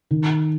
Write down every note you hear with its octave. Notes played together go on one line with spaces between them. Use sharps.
D#3